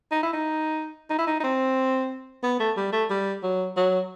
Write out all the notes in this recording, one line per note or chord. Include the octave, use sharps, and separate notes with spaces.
D#4
E4
D#4
D#4
E4
D#4
D#4
C4
B3
A3
G3
A3
G3
F#3
F#3